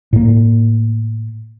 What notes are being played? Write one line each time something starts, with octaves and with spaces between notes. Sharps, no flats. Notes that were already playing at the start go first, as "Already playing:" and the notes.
A2 A#3